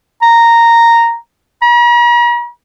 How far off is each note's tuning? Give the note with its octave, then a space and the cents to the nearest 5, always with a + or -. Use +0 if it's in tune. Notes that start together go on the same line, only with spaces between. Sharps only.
A#5 -5
A#5 +45